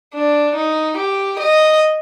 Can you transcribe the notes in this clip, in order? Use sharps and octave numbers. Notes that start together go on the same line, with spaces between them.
D4
D#4
G4
D#5